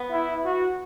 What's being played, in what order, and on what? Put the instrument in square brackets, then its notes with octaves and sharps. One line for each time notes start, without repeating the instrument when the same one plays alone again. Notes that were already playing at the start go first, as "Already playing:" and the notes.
Already playing: [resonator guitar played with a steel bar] B3
[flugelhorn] E4
F#4